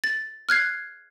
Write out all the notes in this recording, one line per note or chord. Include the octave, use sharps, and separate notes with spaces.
A6
F6 F#6 G#6 C7